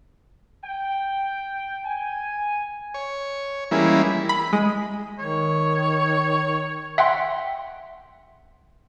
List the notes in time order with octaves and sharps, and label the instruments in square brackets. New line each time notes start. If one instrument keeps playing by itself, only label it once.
[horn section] G5
G#5
[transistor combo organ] C#5
E3 G3 G#3 A#3 C#4 E4
[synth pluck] B5
G#3
[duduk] D#3 [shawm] C#5
[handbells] E5 F#5 G5 C6